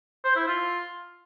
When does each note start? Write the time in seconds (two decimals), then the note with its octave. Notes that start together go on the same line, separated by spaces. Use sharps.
0.24 C5
0.36 E4
0.48 F4